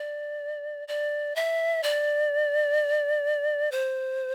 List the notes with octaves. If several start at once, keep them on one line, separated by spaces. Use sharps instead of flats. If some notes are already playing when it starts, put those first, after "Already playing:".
Already playing: D5
D5
E5
D5
C5